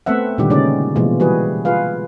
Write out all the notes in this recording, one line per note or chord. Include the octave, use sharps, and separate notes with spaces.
A3 B3 C4 E5 F#5
A#2 D3 D#3 G3 G4
C#3 G#3 C#4 D#4 D5
B2 E3 F3 G#3 A#3
E3 G3 F#4 G#4 B4
F4 G#4 B4 F5